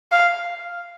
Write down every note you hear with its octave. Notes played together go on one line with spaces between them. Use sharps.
F5